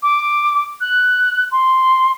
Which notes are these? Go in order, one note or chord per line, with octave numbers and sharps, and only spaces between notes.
D6
F#6
C6